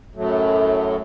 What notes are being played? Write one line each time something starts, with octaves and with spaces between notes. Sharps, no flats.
F#2 A2 F#3 A3